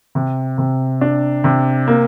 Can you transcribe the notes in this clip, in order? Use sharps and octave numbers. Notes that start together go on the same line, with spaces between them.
C3
C3
D4
C3
A#3